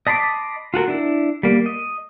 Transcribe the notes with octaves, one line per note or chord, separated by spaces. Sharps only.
D#5 A5 B5 C6 D6
F4 F#4 A4 A#4
D4 E4
G3 A#3
D#5